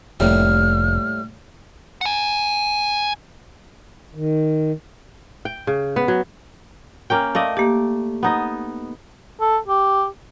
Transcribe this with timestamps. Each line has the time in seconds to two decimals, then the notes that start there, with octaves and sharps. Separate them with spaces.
0.20 F1 A2 G3 A#3 F6
2.01 F#5 G#5
4.15 D#3
5.45 G5
5.67 C#3
5.96 B3
6.08 F#3
7.10 A#3 C#4 G5
7.35 A3 D5 D#5 F5
7.57 A#3 G4 D5
8.23 B3 D#4 D#5
9.40 A4
9.68 G4